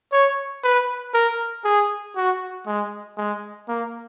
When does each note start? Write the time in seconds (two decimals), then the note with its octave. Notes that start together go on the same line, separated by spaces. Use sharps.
0.12 C#5
0.63 B4
1.14 A#4
1.65 G#4
2.16 F#4
2.66 G#3
3.17 G#3
3.68 A#3